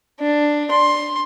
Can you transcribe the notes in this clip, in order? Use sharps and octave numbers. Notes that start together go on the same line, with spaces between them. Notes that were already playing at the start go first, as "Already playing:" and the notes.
D4
C6